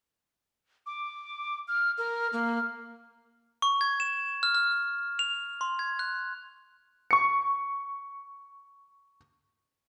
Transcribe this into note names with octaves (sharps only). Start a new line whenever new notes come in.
D6
F6
A#4 F6
A#3
C#6
G#6
E7
F6
F6
F7
C6
G#6
F#6
C#6 C#7